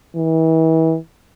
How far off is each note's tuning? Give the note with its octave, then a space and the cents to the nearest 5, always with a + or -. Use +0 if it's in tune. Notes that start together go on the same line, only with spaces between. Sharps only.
E3 -35